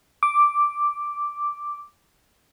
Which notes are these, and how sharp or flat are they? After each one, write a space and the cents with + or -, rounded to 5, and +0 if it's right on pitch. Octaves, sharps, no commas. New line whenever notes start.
D6 +0